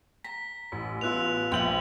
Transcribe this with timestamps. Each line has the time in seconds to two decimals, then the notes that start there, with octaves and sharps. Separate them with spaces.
0.24 A#5 B6
0.72 A1
1.01 B3 F4 E6 F#6 F7
1.52 A#1 E5 G5 F#7